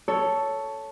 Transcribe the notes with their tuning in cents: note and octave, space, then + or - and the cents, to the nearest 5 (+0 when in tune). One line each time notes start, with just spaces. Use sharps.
A4 +0 C#5 +10